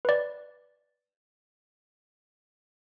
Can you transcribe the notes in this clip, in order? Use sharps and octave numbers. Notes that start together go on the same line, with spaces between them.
B4 D5